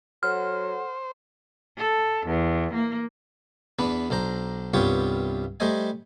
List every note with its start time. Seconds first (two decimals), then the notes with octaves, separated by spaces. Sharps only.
0.23 F#3 A4 C5 F#5 F6
1.77 A4
2.26 E2
2.74 A#3
3.79 E2 B3 D4 B4
4.10 B1 D4 C5 A#5
4.74 C2 G2 B3 F4 G4 C#5
5.60 G3 A3 C5 D#5 G#5